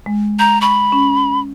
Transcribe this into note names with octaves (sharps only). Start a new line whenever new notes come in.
G#3
A#5 G6
B5 C#6
C#4